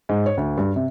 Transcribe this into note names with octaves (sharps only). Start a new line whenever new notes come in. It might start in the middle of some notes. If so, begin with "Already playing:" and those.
G#2
C#5
D2
G2
C3